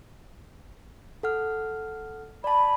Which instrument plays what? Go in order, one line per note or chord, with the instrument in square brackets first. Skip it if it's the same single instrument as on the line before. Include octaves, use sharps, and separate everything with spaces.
[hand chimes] A4 F#5 F6
[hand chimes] D5 A5 [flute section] B5